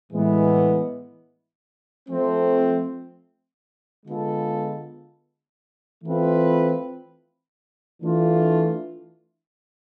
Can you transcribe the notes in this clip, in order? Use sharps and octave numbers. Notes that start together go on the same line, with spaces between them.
A2 E3 G#3 B3
F3 A3 C4
D3 G#3 B3 F4 A4
E3 A3 C4 F4 B4
E3 A3 D4 F4